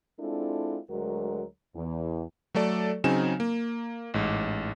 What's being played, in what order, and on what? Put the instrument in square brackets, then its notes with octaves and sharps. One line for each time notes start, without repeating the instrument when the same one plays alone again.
[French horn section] G#3 C4 D4 E4 F4 A4
D2 F#3 G#3 F#4 A#4
E2
[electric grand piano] F#3 A3 A4 D5
C#3 F#3 C4 D#4 G#5 E7
A#3
A1 G#2